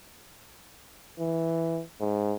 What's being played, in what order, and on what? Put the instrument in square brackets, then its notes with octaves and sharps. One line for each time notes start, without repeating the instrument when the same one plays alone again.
[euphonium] E3
G#2